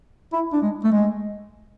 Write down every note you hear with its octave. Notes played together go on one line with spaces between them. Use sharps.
E4
D4
G#3
A3
G#3